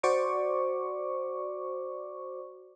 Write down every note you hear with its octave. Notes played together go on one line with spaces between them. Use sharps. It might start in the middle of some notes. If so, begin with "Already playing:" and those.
F#4 C5 D5 C#6 D6